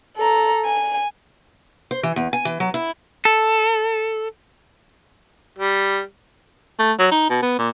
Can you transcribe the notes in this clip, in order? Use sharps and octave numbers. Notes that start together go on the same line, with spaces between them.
A4 A#5
G#5
C5
E3
E2
G#5
E3
F#3
E4
A4
G3
A3
F#3
D#4
B2
B3
A#2